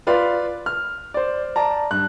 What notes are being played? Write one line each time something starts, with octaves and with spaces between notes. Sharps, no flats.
F4 B4 D5 F5 C6
F6
C5 D5
D5 A5 A#5
G2 F#6